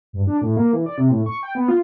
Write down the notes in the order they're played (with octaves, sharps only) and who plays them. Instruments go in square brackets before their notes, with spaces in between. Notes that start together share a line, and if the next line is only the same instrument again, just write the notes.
[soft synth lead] G2
D4
A2
A#3
E3
D5
C3
A2
C#6
G5
B3
F4